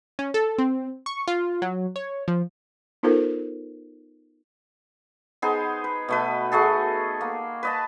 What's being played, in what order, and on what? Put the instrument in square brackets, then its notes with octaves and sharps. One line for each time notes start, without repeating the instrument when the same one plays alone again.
[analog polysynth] C#4
A4
C4
C#6
F4
F#3
C#5
F3
[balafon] B3 D#4 F4 A4 A#4 C5
[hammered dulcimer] B3 D#4 G#4 C5
B4
B2 A3 B4
A3 F#4 G#4 A4
A#3
B4 D#5 A5